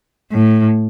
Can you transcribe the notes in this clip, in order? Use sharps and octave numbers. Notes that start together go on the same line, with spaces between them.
A2